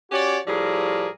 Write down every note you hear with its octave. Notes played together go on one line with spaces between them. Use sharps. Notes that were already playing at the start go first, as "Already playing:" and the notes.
C#4 F#4 G4 C#5 D5
A2 F3 G3 G#4 A#4